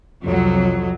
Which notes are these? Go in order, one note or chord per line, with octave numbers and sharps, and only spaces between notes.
C2 F2 F#3